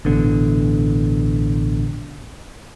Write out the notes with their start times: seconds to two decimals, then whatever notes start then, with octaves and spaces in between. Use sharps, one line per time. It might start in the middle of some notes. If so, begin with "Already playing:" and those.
0.05 A1 B2 D3